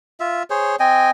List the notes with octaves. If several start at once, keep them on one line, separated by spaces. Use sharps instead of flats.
F4 E5
G#4 C5 C#5
C4 D#5 G5 G#5